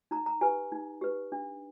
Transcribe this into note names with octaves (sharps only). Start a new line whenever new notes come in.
D#4 A#5
A#5
G4 B4 G#5
D#4
G4 B4
D4